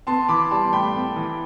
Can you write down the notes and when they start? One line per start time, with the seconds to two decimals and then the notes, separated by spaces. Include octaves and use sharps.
0.07 B3 A5 C6
0.28 E3 B5 D6
0.51 G3 A5 C6
0.73 A2 G5 B5
0.95 B3
1.16 E3